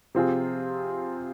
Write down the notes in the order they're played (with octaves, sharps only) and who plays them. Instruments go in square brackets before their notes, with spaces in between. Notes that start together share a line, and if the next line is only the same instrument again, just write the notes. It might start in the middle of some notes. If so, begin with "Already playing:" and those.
[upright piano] C3 F3 C4 F4 G#4